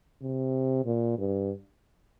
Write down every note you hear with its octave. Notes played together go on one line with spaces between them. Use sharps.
C3
A#2
G2